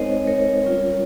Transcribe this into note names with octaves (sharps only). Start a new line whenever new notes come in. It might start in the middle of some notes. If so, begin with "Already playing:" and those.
Already playing: G#3 C4 D#4 A#4 C5 C#5 D#5
A#4 C#5
G3 C#4 F4